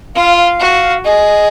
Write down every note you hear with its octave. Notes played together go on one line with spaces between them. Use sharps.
F4 F5
F5
F#4
G#4 D#5